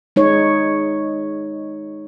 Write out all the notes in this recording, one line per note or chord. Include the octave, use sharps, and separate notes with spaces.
G#3 D#4 C#5